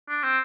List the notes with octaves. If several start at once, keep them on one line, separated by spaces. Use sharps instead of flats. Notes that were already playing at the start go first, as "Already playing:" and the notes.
D4
C4